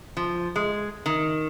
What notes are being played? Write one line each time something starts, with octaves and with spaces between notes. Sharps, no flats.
F3
G#3
D#3